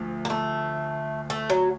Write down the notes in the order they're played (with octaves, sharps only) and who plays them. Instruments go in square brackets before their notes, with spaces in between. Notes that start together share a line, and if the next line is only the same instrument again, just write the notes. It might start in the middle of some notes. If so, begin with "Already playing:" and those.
Already playing: [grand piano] D2 F3
[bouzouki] A#3
A3
A3
F#3